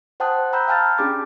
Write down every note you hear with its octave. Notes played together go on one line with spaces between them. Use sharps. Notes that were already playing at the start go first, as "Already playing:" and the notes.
C5 F#5 G5 A5 D#6 F#6
G5 A#5 B5 E6 F#6 G6
F5 G5 A5 F6 G6 A6
C#4 D4 G4 G#4 D6 A6